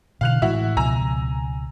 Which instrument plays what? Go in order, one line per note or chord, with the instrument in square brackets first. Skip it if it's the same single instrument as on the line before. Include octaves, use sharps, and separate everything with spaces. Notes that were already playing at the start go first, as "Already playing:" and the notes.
[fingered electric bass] B2 D3 E3 [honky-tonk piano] F5 F#6 F7
[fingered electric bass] A2 E3 G#3 [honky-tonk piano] E4 F#4 E5
[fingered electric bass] C#2 B2 F3 [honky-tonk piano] G#5 A#5 E6